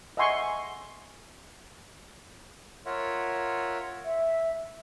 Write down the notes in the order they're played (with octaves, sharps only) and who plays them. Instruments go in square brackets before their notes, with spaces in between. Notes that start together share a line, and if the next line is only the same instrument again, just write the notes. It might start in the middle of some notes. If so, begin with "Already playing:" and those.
[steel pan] D#5 E5 F#5 G#5 C6 C#6
[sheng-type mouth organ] F4 A#4 C#5 E5 F#5
[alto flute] E5